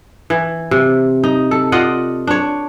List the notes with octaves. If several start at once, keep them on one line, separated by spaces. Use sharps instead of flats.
E3
C3
D#4
A4
F4 D5 D#5 F#5
D4 C#5